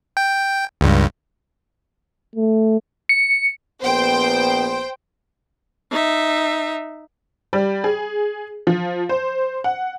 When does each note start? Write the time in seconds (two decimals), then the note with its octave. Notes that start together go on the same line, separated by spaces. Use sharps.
0.17 G5
0.81 C#2 G2
2.36 A3
3.09 C#7
3.82 A#1 B3 C5 G5
5.91 D#4 E5
7.53 G3
7.84 G#4
8.67 F3
9.09 C5
9.64 F#5